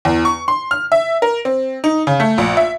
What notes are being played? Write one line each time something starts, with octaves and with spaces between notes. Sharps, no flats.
E2
C#6
C6
F6
E5
A#4
C4
D#4
C#3
A3
A#1
E5